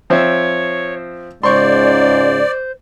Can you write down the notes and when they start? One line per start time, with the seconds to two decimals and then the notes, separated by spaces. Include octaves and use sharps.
0.10 F3 C4 C#5 E5
1.43 C#2 G#2 C#3 C5 D5 C6 C#6